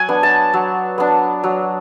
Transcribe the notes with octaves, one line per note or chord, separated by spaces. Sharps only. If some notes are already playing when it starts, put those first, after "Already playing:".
Already playing: F#3 F#5 G#5
B3 D4
A5
F#3
B3 D4
F#3